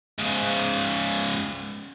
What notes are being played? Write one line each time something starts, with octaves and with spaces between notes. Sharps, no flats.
G#2 C#3